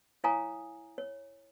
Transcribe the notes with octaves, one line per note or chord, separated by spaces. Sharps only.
E4 C#5 F5 G#5 A#5 D#6
C#5